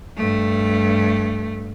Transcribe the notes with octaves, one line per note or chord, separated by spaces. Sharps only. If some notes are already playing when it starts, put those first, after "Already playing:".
G2 A3